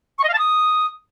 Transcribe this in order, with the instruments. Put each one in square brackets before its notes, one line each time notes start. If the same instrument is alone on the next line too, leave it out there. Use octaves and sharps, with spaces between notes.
[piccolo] C#6
D#5
F5
A5
D#6